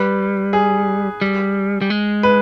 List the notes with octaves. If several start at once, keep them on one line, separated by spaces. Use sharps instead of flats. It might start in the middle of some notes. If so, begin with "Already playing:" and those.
Already playing: G3 B4
G#4
G3
G3
G#3
B4